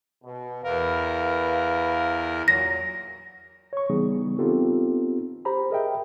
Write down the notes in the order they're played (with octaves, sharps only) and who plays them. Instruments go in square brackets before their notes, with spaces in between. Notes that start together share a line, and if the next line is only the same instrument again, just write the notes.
[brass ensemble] B2
[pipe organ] E2 A#4 [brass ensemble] B4 F5
[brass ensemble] A#2 F#3 [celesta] A#6
[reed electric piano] C#5 C#6
C#3 E3 G3 B3 D#4 G#4
B3 C4 D#4 F4 G4 A4
G4 C5 A#5 B5
G#4 A#4 D#5 E5 G5